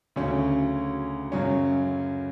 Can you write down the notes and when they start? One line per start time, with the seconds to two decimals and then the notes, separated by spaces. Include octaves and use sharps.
0.16 D2 C#3 F#3 C#4
1.32 F#2 C#3 F#3 C#4